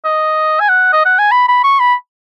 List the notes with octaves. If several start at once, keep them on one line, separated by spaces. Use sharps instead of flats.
D#5
G#5
F#5
D#5
F#5
G#5
B5
B5
C#6
B5